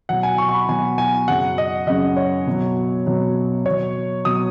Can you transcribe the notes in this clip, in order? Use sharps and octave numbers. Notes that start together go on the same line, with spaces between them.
B2 F#3 F#5
G#5
C#6
C#6
B5
B2 F#3 G#5
G#5
F#2 C#3 F#3 F#5
D#5
F#2 C#3 F#3 D#5
C#5
B2 F#3
B2 F#3
B2 C#5
F#3
B2 F#3 D#6